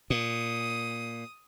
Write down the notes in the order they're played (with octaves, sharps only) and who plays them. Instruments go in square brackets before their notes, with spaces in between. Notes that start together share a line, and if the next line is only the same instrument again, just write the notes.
[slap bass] A#2 [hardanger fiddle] D#6